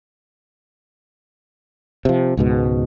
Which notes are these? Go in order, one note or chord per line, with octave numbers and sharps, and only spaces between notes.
C3 F3
C#2 G#2 B2